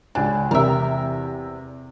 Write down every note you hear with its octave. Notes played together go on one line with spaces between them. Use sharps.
C#2 D4 G#5
E2 C3 A#4 E5